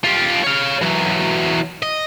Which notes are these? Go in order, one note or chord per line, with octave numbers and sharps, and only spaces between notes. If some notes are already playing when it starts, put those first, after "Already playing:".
F4 G4
C#5 F5
E3 F#3
D#5